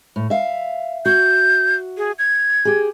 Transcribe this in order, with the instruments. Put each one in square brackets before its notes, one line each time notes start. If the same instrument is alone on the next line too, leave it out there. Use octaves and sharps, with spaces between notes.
[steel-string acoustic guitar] A2
E5 F5
[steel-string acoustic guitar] F#4 [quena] G6
[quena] G#4
G#6
[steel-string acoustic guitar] G4 G#4